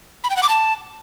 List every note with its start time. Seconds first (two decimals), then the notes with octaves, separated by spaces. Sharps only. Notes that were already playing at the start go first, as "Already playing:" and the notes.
0.24 B5
0.30 G5
0.36 F#5
0.43 D6
0.49 A5